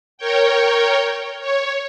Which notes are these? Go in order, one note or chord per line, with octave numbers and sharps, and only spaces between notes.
A#4 C#5 G5
C#5